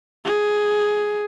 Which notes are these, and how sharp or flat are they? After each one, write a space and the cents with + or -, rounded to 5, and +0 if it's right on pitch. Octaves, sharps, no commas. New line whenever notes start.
G#4 +5